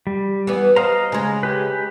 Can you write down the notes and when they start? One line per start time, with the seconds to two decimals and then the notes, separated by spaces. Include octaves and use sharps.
0.07 G3
0.47 E3 B3
0.76 C5 D#5 F5 A#5
1.12 C#3 G#3
1.43 G4 B4